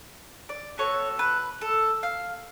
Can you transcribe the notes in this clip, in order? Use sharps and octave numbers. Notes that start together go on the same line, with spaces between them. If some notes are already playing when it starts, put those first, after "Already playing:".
D5
B3 F#4 A4 C#5
B4
A4
F5